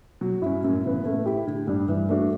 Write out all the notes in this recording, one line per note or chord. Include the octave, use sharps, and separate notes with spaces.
B2 F#3
G2 C#4 E4
G2
F#2 A2
C#3 E3 B3
A2 A3
E4 G4
A2 D3
G2 G3 D4
G2 E3
A3 D4 F#4